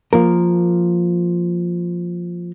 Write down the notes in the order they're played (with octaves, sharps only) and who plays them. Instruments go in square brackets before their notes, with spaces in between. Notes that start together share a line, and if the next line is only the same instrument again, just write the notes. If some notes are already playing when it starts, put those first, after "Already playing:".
[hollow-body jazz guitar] F3 A#3 A#4